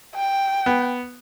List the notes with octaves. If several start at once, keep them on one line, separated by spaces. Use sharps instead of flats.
G5
B3